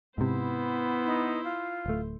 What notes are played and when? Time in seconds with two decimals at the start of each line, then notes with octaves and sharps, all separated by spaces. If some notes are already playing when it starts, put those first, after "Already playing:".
0.18 G#2 C3 B3 E4 C5
1.06 D#4
1.44 F4
1.86 D1 A3